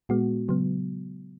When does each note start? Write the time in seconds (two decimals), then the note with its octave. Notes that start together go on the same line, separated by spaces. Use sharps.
0.09 A#2 G#3 B3 F#4
0.48 C#3 F#3 B3